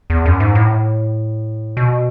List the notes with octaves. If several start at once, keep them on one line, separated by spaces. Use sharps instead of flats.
E2
F#2
G#2
A2
B2